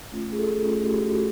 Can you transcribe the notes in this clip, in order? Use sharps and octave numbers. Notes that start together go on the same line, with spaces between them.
A3 C#4 F4
G#4
A4
A3 C#4 F4 A4
G4
F#4